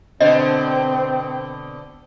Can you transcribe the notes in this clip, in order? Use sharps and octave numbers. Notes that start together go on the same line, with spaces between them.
B2 D3 C4 C5 D#5